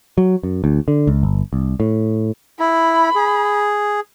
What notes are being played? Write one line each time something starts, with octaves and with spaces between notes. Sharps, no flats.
F#3
F#2
D2
D3
C#2
G1
C2
A2
E4 B5
G#4